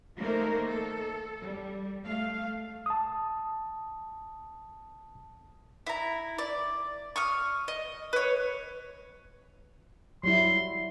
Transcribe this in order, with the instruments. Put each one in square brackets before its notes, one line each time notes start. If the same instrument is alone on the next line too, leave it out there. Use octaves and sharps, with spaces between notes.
[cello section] D#3 A3 A#3 D#4 A#4 C5
A4
G3
A3 F5
[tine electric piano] A5 D#6
[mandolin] E4 A#5
D5
C#6 D#6 F6
D#5
B4 C#5
[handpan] F#3 G3 E4 [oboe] C6